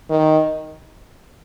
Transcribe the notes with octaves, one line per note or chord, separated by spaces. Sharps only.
D#3